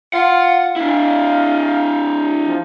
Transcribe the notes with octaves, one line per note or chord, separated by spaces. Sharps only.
F4 F#5
D4 E4 F5
F3